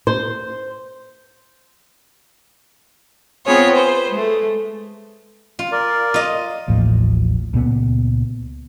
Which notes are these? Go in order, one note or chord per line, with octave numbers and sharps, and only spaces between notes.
C5
B3 C4 F4 G#4 C#5
B4 C5
G#3 A3
F4
A#4 D5
F4 D#5
A1 D#2 A2 F3
C#2 A#2 B3